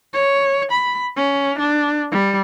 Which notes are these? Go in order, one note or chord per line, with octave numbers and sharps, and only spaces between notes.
C#5
B5
C#4
D4
G3